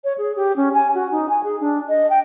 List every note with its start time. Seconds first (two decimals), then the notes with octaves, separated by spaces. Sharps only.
0.04 C#5
0.18 G#4
0.36 G4
0.56 C#4
0.74 G#5
0.94 F#4
1.11 D#4
1.29 G#5
1.44 G#4
1.61 D4
1.89 D#5
2.10 G5